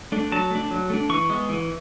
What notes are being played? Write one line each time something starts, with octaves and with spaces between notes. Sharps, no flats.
A3 D4
F#3 A5
A3 D4
F#3
A3 D4
E3 C#6
G#3 B3
E3